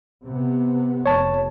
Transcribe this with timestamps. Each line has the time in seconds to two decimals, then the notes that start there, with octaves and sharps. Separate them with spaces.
0.25 C3 B3
1.06 F1 C#5 A5